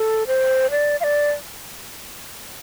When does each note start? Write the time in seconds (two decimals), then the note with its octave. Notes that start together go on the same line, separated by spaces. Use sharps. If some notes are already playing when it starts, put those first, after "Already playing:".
Already playing: A4
0.27 C5
0.71 D5
1.00 F5
1.04 D5